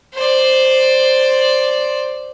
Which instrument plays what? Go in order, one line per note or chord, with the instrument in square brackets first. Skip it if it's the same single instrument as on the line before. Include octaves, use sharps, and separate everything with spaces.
[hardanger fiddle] C5 D5